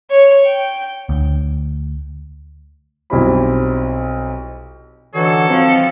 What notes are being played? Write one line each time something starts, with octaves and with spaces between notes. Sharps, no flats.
C#5
G5
D2
B1 G3 C4 E4 C5 B5
D3 E3 D#4 F#4 A4 C#5
F3 C4